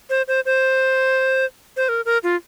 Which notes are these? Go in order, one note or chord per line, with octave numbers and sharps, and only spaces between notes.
C5
C5
C5
C5
A#4
A#4
F4